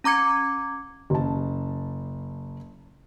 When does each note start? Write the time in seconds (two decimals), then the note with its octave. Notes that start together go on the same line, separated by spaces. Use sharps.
0.04 C#4 A#5 D6 G#6 C#7
1.10 F#1 A5